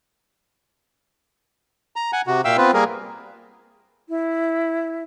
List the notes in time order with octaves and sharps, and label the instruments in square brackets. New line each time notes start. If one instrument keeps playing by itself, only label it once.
[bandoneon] A#5
F#5 G#5
C3 F#4
A#2 E5 F5 G5 E6
B3 C4 F4 B4
G3 A#3 G#4 A#4
[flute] E4